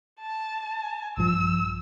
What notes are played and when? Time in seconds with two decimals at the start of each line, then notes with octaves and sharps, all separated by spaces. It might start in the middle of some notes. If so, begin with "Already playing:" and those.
0.20 A5
1.17 A#1 G2 F3 E6